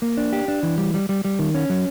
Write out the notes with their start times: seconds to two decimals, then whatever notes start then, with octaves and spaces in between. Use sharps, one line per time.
0.02 A#3
0.17 D4
0.33 G4
0.48 D4
0.63 E3
0.78 G3
0.94 G3
1.09 G3
1.25 G3
1.39 D#3
1.54 C#4
1.70 F#3